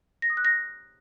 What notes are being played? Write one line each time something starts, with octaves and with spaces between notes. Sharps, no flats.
A#6
D#6
F#6
A#6